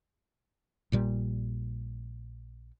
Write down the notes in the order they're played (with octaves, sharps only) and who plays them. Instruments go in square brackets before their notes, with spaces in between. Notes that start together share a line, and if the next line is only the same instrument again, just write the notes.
[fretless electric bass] A#1 A#2 G3